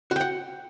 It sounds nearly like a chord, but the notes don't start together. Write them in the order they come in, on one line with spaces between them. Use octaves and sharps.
F#4 G5 F#5